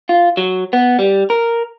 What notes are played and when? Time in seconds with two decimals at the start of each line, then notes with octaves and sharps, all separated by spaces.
0.09 F4
0.37 F#3
0.73 B3
0.99 G3
1.30 A#4